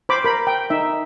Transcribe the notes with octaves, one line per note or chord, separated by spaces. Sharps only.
C5 B5 D6
A#4 B5
G5
D#4 E5